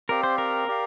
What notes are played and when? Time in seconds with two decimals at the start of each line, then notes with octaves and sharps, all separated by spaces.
0.09 C4 G4 A#4 D5 F5
0.23 C5
0.38 A#4
0.68 G4 D5 F5